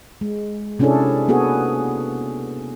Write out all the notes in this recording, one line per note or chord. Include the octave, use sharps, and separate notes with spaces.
G#3
C3 C#4 D4 E4 G#4 A4
A#3 B3 F#4 G#4 A4